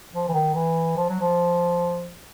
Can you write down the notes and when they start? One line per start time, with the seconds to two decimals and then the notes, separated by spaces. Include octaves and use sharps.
0.14 F3
0.28 E3
0.34 D#3
0.54 E3
0.97 F3
1.09 F#3
1.21 F3